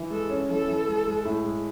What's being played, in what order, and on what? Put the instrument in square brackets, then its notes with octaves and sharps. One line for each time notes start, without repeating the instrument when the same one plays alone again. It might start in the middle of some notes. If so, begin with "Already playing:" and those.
Already playing: [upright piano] E3
[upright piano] G#3 [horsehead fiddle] A4
[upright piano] C#4
[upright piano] E3 [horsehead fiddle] A4
[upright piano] E3
G#3
G#3
A2
G#3